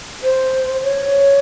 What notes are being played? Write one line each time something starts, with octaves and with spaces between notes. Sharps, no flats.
C5
C#5